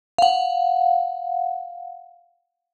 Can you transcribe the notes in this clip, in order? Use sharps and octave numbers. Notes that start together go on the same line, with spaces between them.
F5 F#5